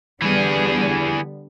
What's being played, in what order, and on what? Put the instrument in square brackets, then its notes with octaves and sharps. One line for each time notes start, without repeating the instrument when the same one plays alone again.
[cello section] D3 G3 B3 [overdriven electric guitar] E3 G#4